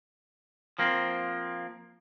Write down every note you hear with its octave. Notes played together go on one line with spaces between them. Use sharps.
F3 A#3 C4